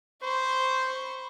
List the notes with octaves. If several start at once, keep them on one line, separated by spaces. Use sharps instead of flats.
C5 B5 C#6